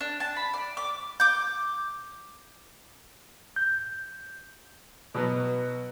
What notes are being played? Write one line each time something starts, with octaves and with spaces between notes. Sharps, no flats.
D4
A5
B5
D5
D6
D6 G6
G6
B2 F#3 B3